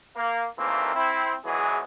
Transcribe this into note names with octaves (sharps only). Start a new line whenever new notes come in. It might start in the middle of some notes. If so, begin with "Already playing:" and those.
A#3
G#1 D#2 E3 A3 A#3 C4
C4 E4
A#1 E2 E3 F#3 G#3 G#4